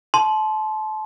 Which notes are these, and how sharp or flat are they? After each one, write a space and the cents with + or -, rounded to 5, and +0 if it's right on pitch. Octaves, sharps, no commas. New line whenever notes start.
A5 -30 C6 +0